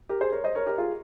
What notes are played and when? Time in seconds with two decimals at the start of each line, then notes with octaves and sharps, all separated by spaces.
0.09 G4 A#4
0.21 G#4 C5
0.32 A#4 C#5
0.44 C5 D#5
0.55 A#4 C#5
0.66 G4 A#4
0.78 F4 G#4